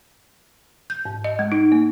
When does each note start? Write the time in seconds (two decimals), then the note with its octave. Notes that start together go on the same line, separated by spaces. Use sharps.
0.90 G6
1.05 G#2
1.24 D#5
1.39 G#3
1.52 D#4
1.72 A#3